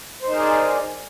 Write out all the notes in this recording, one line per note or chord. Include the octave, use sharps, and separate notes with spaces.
D#4 G#4 A#4 C5 D5